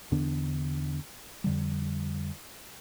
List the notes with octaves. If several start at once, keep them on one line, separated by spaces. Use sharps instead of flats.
E2 D3 B3 D4
F2 D3 G3